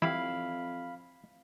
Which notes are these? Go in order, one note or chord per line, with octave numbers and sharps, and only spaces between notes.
F2 E3 G3 E4 F5 B5